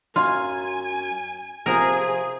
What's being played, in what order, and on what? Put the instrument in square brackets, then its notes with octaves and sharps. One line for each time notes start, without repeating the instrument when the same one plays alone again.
[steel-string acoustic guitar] F#2 [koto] F4 [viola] G#5
[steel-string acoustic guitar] C3 F3 A#5 [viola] G#4 [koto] A#4